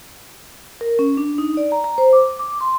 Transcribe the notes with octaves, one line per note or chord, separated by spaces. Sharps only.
A#4
C#4
D4
D#4
D5
A#5
A#5
C5
D6
D6
C6